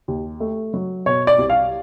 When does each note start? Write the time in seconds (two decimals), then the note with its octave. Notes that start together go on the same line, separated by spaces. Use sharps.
0.08 D#2
0.40 A3
0.74 F#3
1.06 B2 C#5
1.27 D5
1.39 C2
1.50 F5